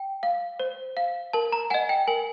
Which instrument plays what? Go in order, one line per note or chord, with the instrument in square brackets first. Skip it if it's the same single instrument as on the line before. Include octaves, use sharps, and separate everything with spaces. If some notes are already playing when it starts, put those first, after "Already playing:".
Already playing: [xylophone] G5
F5
C5
F5
A#4 A5
A#5
D#5 F#5 G#5
G5
A#4 G#5